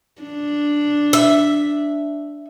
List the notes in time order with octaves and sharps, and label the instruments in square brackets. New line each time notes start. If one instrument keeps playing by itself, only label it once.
[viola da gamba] D4
[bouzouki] E5